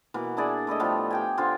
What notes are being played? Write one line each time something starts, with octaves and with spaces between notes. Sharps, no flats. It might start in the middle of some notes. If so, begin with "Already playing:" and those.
B2 E3 A#3
D4 E4 G#4 D5
A3 E4 A4 D#5
A2 F3 G3 B3
G4 G5 G#5
D3 F4 C5